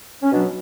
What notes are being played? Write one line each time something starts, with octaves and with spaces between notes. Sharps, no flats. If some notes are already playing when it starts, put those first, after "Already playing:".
C#4
B2 F#3 D4